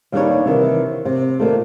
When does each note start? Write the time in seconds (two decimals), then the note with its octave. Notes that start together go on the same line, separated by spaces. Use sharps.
0.12 D#2 G3 B3 D4 D#4 C#5
0.46 C3 D#3 E3
1.05 C3
1.39 A#2 D#3 A3